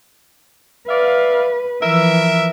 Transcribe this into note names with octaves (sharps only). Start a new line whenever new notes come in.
B4 D5 E5 F5
E3 F3 A#4 B4 E5